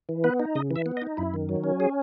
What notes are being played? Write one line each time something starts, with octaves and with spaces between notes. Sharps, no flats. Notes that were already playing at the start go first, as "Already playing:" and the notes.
E3
B3 B4
D#4
C#3 D#5
E3
E5
B3
D#5
D#4
F#2 E4
D#3
F#3
C#4
G#4